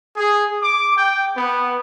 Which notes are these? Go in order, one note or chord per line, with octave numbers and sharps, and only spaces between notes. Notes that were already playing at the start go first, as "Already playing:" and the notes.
G#4
D6
G5
B3